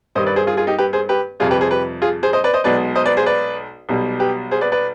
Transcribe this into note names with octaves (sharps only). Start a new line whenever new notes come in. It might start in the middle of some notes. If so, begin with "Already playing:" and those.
G2 D#3 G3 C5 D#5
B4 D5
G#4 C5
F4 G#4
F4 G#4
D#4 G4
G4 B4
G#4 C5
G4 B4
F2 C3 G3 F4 G#4
G4 B4
G#4 C5
G4 B4
F4 G#4
G#4 C5
C5 D#5
B4 D5
C5 D#5
B1 B2 G#3 B4 D5
C5 D#5
B4 D5
G#4 C5
B4 D5
B1 B2 G3
G4 B4
G#4 C5
B4 D5
B4 D5